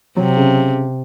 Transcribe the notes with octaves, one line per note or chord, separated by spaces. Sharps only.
C3 F#3
C#3